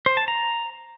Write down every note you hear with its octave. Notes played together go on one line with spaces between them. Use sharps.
C5
A5
A#5